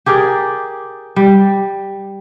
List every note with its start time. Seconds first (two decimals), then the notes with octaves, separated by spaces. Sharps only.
0.06 G4 G#4 A#4 D5
1.16 G3